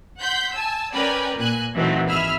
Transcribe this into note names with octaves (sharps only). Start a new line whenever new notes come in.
F#5 C6 G6 B6
G#5 A5 E6
C#4 A#4 B4 D5 G5 G#5
A#2 G#5 F#6
A#2 D#3 E3 F#3 A3 C4
G#1 G#4 E5 B5 F6